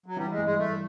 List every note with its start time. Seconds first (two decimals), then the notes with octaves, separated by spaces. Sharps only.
0.06 F#3
0.17 E3 G3
0.31 G#3
0.37 G2
0.45 G#3
0.58 G2 A3